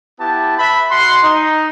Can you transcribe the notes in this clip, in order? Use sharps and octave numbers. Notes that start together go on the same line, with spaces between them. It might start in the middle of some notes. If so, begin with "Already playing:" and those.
B3 E4 G4 A5
B4 E5 A5 B5
F#4 F#5 C6
D#4